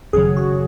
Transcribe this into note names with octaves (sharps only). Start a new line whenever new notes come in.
G#1 F#2 C#3 F#3 G#4
F#4